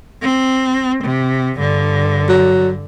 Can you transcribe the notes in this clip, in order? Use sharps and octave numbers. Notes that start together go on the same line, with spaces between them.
C4
C3
G2 D3
F#3